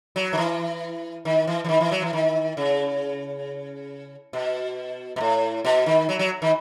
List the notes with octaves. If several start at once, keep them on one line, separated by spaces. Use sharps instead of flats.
F#3
D#3
E3
D#3
E3
E3
D#3
E3
F#3
E3
D#3
C#3
B2
B2
A2
B2
D#3
F#3
F#3
D#3